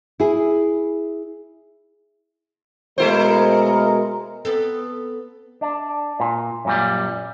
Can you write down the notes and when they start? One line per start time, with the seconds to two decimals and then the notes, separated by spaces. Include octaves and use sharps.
0.20 E4 G#4
2.98 B2 G#3 A3 E4 A#4 C5
4.45 B3 C4 A4
5.61 D4
6.20 A#2
6.65 F#2 A#2 G3